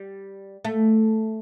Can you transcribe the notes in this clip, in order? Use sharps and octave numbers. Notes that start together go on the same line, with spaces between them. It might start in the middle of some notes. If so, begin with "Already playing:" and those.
Already playing: G3
A3